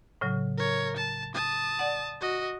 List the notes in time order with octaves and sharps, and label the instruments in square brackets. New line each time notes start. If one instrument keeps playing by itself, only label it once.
[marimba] A2 C#3 F#3
[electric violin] A#4 C#5
A5
A5 D#6
[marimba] D5 F#5
[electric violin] F#4 D#5